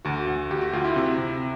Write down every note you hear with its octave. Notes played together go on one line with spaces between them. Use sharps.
D2 F#4
D2
D2 G4
F#4
D2 F4
E4
C3
C3